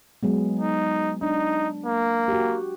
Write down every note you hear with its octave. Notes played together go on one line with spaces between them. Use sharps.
F#3 G#3 B3
D#4
D4 D#4
A#3
F#4 G4